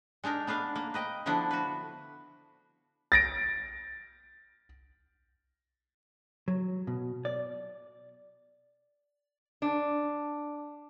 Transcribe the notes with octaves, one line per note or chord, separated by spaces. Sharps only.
G#3 D4 D#4 A#4
B3 D4 B4 F5
A#3
B4 D#5 G5
D3 F3 B3 D4 E4
F#4 B4
A6 A#6 D7
F#3
B2
D5
D4